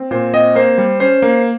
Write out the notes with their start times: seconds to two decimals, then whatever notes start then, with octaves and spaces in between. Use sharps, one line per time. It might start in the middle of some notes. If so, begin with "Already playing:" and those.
Already playing: C4
0.11 A#2 C5
0.34 C4 D#5
0.55 A#3 C5
0.78 G3
1.00 C#4 C5
1.22 A#3